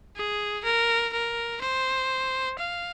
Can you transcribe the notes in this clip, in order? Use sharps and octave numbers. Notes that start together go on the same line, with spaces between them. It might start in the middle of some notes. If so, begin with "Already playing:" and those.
G#4
A#4
A#4
C5
F5